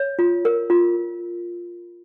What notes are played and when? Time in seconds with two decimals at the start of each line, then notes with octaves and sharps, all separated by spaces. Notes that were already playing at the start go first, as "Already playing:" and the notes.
Already playing: C#5
0.19 F4
0.45 A#4
0.70 F4